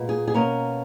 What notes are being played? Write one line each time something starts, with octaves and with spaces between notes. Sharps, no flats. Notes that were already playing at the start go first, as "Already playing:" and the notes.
Already playing: A#2 G#3 B3
G#4
G#4
B2 A#3 C#4 A#4